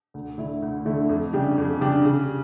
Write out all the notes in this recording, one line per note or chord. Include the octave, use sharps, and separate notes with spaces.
D2
D3 A3 E4
D2
D3 A3 E4
F2
C#3 G3 D4 G4
F2
C#3 G3 D4 G4
C#3